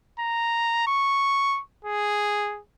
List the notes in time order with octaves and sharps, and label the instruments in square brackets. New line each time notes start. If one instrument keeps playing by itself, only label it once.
[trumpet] A#5
C#6
G#4